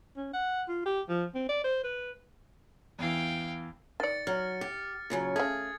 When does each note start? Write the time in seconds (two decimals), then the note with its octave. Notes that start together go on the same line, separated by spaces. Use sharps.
0.17 C#4
0.34 F#5
0.68 F4
0.86 G4
1.09 F3
1.35 C4
1.49 D5
1.64 C5
1.84 B4
2.99 E2 E3 F5 G5
4.00 D#3 D5 A6 C#7
4.27 F#3 F6
4.61 G4
5.10 A#2 C#3 F#3
5.36 C#3 A3 G#4 G#6